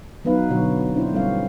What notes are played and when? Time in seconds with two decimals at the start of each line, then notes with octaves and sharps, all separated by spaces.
0.25 F#3 B3 D#4 B4 F5
0.49 B2 D3 F#3 F#4 C#5
0.93 C4 D4 E4 C5
1.13 G3 A3 C4 C#4 C#5 F5